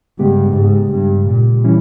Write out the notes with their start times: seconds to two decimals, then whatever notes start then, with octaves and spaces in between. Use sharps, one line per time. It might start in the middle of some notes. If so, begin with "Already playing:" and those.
0.19 G2 C#3 G#3 B3 G4
0.56 G#2
0.92 G2
1.27 A#2
1.64 E3 G3 C#4 E4